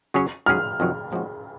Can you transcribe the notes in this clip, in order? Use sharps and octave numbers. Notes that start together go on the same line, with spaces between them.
C#3 F#3 C#4 G#4 C#5
G#2 F#3 C#4 G#4 F6
F2 C3 D#3 F#3
A#2 F3 G#3 C#4 F#4